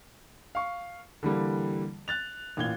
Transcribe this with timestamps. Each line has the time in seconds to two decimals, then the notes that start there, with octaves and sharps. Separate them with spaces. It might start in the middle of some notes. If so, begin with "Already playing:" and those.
0.55 F5 C#6
1.23 D3 E3 G3 A#3
2.08 F#6 A6 F7
2.57 A1 A#2 G#6 G7